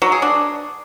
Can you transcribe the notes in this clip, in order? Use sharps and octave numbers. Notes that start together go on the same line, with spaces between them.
F#3
G#4
D4